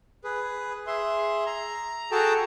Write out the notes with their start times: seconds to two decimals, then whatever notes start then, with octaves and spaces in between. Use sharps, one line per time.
0.24 G#4 B4
0.87 G#4 E5 C6
1.46 A#5
2.12 F#4 G#4 A4 G5 A5 A#5